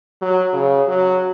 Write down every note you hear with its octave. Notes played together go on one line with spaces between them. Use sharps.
F#3
C#3
F#3